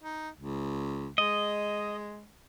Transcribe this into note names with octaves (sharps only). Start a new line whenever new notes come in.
D#4
C#2
G#3 D#5